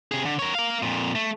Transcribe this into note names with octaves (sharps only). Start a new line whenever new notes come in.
C3 G#4
D3
A#4 C#5
A#4 F5
F2 A#2
A3